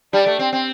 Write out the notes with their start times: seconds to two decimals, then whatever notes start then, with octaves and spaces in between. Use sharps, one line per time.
0.13 G3 D4 D5
0.26 A3
0.39 C4
0.53 C4